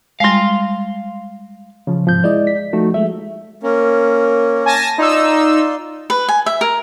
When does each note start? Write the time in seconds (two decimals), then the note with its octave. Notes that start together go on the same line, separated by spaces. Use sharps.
0.20 G3 G#3 F5 C6
1.87 C#3 F3
2.07 G#2 C3 F3 G6
2.24 G#3 E4 D5 D#5
2.47 B6
2.73 F3 A3 D#4 F#4
2.94 F3 G#3 A3 E5
3.63 A#3 C#4 A#4
4.66 G#5 A5 A#6
4.98 D#4 F4 D5 C6 E6
6.10 B4
6.28 G#5
6.46 E5
6.61 A#4